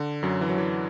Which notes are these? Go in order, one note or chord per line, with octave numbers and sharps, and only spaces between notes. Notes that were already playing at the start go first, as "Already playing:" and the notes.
Already playing: D3
F#2 F#3
E3
F#3
E3